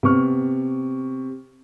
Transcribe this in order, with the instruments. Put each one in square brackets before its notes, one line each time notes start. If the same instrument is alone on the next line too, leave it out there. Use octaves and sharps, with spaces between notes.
[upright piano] C3 B3 C#6 F6